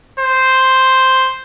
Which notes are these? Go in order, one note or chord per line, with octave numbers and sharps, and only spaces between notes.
C5